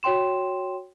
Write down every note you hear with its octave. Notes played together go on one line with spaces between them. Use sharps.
F#4 C#5 G5 C6 E7